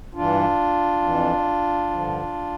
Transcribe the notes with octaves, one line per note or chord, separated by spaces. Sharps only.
G2 E3 D4 F4
F2 E3
G2 D3 F3